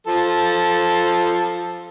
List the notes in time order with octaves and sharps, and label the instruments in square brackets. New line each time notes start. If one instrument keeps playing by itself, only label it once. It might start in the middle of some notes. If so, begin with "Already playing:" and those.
[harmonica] F3 A4